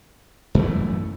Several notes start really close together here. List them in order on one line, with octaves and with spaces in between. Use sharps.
F#2 A3 E3